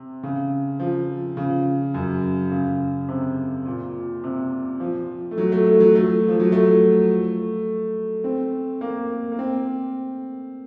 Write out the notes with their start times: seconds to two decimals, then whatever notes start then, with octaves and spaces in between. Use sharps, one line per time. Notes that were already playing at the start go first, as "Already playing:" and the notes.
Already playing: C3
0.23 C#3
0.80 F3
1.37 C#3
1.94 F#2
2.51 C#3
3.09 C3
3.66 A#2
4.24 C3
4.80 F3
5.31 A3
5.38 F#3
5.52 A3
5.66 A3
5.80 F#3
5.95 A3
6.28 F3
6.40 F#3
6.52 A3
8.24 C4
8.81 A#3
9.32 A#3
9.39 C4